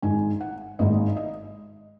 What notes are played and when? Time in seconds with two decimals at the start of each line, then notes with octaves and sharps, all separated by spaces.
0.02 G#1 G#2 G#3 D#4 G#5
0.41 F#5
0.79 G#1 G#2 G#3 D#4 D#5
1.17 D#5